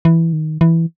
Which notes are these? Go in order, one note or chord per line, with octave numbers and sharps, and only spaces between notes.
E3
D#3
E3